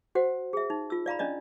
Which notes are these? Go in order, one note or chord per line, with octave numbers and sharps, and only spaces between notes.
F#4 C5 F#5
G#4 E5
D#4
F4 E6
D5 F5 A#5 B5
C#4 D4 D5 D#5